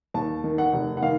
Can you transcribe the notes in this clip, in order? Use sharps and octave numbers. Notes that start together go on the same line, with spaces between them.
D#2 A5
D#3
F#5
F1
F#5
D#3 F5